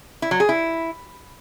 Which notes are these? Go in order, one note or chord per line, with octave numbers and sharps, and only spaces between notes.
E4
F#3
G#4
E4